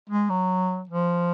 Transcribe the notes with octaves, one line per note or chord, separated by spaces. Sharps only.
G#3
F#3
F3